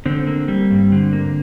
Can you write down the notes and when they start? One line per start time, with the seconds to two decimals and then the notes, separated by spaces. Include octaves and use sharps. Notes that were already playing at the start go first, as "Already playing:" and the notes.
0.06 D3 C4
0.27 A#3
0.48 G3
0.71 G2
0.92 D3
1.13 A#3